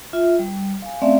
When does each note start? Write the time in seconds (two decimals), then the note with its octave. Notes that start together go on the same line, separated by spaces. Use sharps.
0.13 F4 E5
0.39 G3
0.82 F5 G#5
1.02 A3 C4 C#4 D5 E5 F5